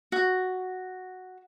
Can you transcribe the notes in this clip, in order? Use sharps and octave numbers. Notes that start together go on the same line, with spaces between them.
F#4